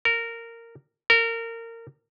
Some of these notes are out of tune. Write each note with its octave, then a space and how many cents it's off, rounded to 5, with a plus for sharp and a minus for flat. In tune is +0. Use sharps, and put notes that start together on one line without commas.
A#4 -15
A#4 -25